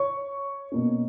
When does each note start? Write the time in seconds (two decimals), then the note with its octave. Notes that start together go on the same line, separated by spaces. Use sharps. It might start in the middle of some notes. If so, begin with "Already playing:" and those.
Already playing: C#5 C#6
0.72 B2 A#3 C#4